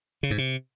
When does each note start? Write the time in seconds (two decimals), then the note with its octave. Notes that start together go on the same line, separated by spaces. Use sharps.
0.23 C#3
0.31 G#2
0.38 C3